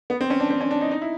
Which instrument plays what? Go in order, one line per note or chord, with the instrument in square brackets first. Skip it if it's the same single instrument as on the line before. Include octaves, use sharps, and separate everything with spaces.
[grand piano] B3
C4
C#4
D4
C4
C#4
D4
D#4
D#4
E4